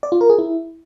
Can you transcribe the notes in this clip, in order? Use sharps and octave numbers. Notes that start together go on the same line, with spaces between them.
D5
F4
A#4
G#4
E4